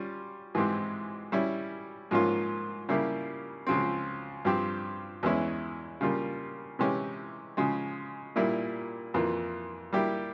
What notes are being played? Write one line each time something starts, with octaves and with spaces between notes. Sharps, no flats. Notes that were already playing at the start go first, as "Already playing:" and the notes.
Already playing: G3 C#4 F4
G#2 E3 G#3 C4 G4
G3 C#4 E4
G#2 F3 A#3 C#4 F4
C#3 G3 A#3 E4 G4
C#2 C#3 F3 C4
G2 F3 C4 G4
E2 E3 G#3 C#4 E4
C#3 G3 A#3 F4
C3 E3 G#3 C#4 G4
C#3 F3 G#3
A#2 G3 A#3 E4 A#4
F2 E3 A#3 F4
G3 A#3 E4 G4